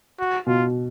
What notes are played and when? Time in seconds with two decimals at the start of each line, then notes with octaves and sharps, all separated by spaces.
0.19 F#4
0.46 B2 F4